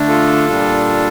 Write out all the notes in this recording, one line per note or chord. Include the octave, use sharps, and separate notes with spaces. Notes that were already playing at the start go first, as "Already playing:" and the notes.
Already playing: D3 A3 D4
F4 A4
A#2 G3 D4